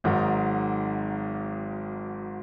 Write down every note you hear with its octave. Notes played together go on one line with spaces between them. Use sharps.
G#1 G#2 D#3 F#3